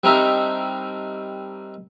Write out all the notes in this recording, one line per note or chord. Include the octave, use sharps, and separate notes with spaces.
G3 C4 D4 D#4 A#4 E5